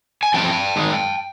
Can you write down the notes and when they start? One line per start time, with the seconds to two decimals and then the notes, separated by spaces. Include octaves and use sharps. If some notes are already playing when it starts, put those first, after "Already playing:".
0.23 G#5
0.34 A2 F3 A3 C4 G5 A5
0.76 G#2 D#3 G#3